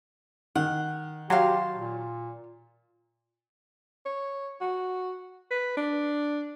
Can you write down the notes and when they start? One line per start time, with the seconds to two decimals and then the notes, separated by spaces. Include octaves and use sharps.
0.55 D#3 F#5
1.30 F#3 G4 F5 A5 C6
1.76 A#2
4.06 C#5
4.61 F#4
5.51 B4
5.77 D4